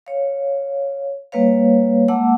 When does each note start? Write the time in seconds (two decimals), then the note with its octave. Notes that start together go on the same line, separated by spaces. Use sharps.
0.07 C#5 F5
1.32 G3 A#3 B4 C#5 F5
2.08 G#3 A#3 F#5 A5 D6 E6